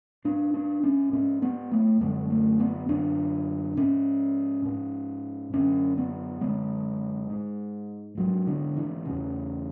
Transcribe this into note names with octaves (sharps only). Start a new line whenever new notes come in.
G#2 D4
D4
C#4
G#2 C#4
B3
A3
F#2 D3 G#3
A3
B3
F#2 D3 D4
G#2 C#4
G#2
F#2 D3 C#4
B3
F#2 D3 G#3
G#2
G#2 F#3
D3
E3
E2 C#3